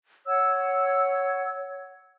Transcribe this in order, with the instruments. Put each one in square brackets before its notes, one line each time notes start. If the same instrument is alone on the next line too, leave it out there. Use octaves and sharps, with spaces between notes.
[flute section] C#5 F#5 E6